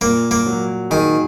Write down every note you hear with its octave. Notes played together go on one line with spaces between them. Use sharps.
A#2 A#3
A#3
F#3
D#3 G#4